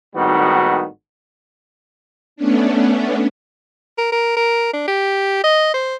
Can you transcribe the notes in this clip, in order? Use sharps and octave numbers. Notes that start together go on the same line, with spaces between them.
G#1 A2 D#3 G3 B3 F#4
A3 B3 C#4 D4
A#4
A#4
A#4
D4
G4
D#5
C5